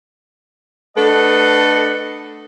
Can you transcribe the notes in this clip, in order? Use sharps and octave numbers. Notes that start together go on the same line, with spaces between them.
A3 D4 A4 B4 D#5 F#5